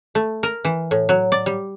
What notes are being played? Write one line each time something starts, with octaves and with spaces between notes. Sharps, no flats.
A3
A#4
E3
A2
F#3
D5
G3